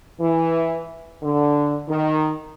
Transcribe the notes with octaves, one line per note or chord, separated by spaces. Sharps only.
E3
D3
D#3